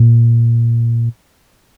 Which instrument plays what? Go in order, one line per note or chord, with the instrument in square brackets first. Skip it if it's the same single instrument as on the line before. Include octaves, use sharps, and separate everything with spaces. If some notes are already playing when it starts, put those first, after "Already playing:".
Already playing: [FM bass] A#2